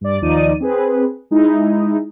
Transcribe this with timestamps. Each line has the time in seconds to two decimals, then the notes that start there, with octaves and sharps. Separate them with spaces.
0.01 G2 D5
0.22 D#2 F3 D#4 D5 D#7
0.60 C4 G#4 B4
1.31 G#3 D#4 E4